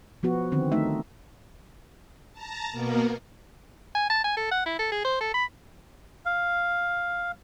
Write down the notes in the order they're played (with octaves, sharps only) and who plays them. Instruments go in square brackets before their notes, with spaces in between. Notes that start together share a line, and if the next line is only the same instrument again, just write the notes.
[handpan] F3 B3 F#4
D3 D#3 C4
A3 D#4 E5
[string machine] A5 A#5
B2 A#3 B3 A#4
[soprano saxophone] G#5
A5
G#5
A4
F#5
E4
A4
G#4
C5
A4
B5
[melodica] F5